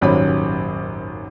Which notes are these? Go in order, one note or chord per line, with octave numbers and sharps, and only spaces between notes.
D#1 G#1 F#2 F#3 C#4 B5